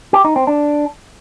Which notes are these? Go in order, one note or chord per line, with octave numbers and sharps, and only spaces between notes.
G4
D#4
C4
D4